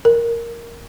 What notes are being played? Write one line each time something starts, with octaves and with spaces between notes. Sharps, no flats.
A#4